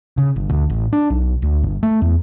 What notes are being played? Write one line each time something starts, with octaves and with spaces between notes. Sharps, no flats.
C#3
G1
D2
A1
D4
B1
D2
G1
A3
E2